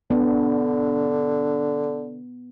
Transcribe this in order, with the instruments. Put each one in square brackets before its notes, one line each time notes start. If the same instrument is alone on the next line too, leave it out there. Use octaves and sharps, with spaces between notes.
[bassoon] D3 [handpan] B3 [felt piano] D4